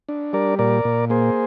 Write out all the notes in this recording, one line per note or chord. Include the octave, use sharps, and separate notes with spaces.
D4
G3 A#4 D5
A#2 A#4 D5
A#2
A#3 G#4 C5